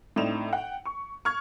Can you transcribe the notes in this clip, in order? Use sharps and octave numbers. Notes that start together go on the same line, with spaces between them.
A2 C4 D4 D#4 E7 F7
F#5 G5
C#6
C#6 F6 G#6